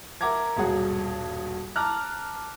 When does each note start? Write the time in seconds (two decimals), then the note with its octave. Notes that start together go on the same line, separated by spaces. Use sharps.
0.21 A#4 E5 F#5 A#5 D6 G#6
0.56 D#1 G2 B2 F#3 G#4 F#5
1.76 A5 A#5 D6 F6 F#6